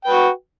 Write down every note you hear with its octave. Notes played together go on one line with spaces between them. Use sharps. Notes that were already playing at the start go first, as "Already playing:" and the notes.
F#4 B4 G5